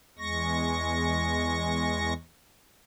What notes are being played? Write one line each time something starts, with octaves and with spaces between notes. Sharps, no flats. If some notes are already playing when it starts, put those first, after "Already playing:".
E2 G#3 C#6 A#6